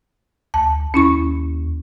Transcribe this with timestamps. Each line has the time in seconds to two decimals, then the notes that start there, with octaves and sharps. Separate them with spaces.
0.54 D2 A5
0.94 D#2 C#4 E4 C#6